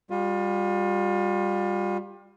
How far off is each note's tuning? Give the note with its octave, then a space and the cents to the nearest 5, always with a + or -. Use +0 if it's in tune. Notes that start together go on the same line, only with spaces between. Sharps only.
G3 +20 F4 +35